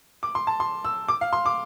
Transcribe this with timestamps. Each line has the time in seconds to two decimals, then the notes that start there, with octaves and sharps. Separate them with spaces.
0.23 D6
0.35 C6
0.47 A5
0.60 C6
0.85 E6
1.08 D6
1.21 F5
1.33 C6
1.46 D6